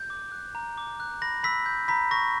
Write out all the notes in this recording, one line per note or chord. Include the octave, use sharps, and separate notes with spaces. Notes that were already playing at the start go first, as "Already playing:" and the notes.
Already playing: G6
D6
F#6
A#5
D6
F#6
B5 A#6
B5 E6 B6
G6
A#5 B5 B6
C#6 A#6